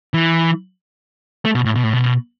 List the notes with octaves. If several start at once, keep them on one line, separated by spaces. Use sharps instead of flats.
E3
A3
B2
A2
B2
A2
B2